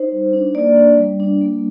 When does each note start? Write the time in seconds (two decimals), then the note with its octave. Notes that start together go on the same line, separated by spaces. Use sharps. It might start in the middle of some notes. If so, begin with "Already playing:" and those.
Already playing: D#4 C5
0.12 G3
0.33 D4
0.55 A#3 D5
0.76 D4
0.97 G3
1.20 D4
1.41 A#3